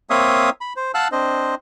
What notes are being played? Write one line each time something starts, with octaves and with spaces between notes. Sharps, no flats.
A#3 C4 C#5 E5 F5 D#6
B5
C5
F5 F#5 A5 E6 F#6
C4 D4 C5 D#5